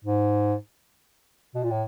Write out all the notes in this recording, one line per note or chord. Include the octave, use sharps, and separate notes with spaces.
G#2
B2
A#2
A2